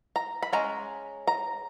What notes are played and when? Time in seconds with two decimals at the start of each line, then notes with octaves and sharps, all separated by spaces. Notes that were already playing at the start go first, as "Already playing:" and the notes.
0.16 A#5
0.43 B5
0.53 G#3 C#4 A#5
1.27 A#5